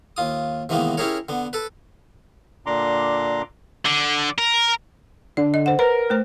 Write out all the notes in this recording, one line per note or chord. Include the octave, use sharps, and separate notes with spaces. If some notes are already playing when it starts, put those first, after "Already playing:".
D#2 F4 D#6
C3 D#3 E3 G#3 A#3 B3
C#4 E4 G4 G#4 A#4 C#5
D3 B3
A4 B4
A#2 D3 D4 A#5 C6 D6
D3
A#4
D3 D5
D#5
C5 F#5
A#4 B4
A3 C5